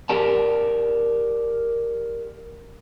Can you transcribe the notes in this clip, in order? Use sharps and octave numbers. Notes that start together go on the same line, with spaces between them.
G4 A#4 D5 A5